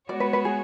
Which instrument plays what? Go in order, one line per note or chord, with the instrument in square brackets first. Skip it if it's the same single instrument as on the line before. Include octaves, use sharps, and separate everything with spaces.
[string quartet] G#3 B3 F#4 C#5 [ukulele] D5
[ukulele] B4
B4
G#4